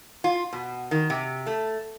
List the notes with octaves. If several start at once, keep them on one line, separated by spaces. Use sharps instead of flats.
F4
B2
D#3
C3
A3